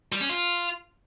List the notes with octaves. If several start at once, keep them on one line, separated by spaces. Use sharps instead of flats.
G3
C#4
F4